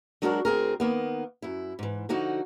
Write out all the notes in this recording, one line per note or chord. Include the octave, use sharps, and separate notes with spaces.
F#3 G#3 D4 E4 F#4 A#4
D2 C4 G#4 A#4
D#3 A#3 B3
F#2 E4
G#2 E3
D3 F3 D#4 F#4